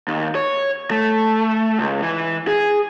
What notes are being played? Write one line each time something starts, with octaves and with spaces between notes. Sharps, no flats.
D#2
C#5
A3
C#2
E3
G#4